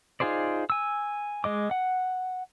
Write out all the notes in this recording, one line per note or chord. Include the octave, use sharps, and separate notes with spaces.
D#4 F4 G#4 C5 D5
G#5 E6
G#3 D#5 D6
F#5